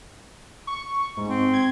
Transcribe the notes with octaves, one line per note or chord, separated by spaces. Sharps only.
C#6
G#2
C4
G#6